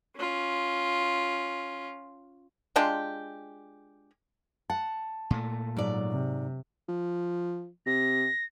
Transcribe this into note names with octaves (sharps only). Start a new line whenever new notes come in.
C#4 F4
G#3 D4 F4 G4
F#5 A5
A#2 A3
G#2 F#3 D5
C3
F3
C3 A#6